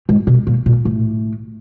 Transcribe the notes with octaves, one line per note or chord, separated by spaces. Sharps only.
G#2
B2
A#2
A#2
A2